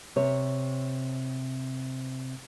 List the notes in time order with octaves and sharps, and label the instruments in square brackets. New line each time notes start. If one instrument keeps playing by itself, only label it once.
[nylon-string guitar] C3 C#5